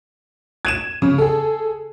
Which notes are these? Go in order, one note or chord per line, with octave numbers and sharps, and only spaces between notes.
G#6 D#7 E7
C#3
G#4 A4